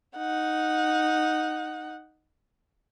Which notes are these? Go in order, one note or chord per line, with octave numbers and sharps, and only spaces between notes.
D#4 F#5